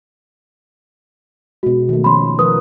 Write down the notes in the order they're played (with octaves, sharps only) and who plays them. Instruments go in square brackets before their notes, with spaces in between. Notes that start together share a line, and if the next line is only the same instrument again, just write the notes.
[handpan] B2 G#3 [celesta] F#4
[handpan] D#3 A3
[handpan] D#3 F3 C#4 [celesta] B5 C6
[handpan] F3 A#4 B4 [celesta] D#6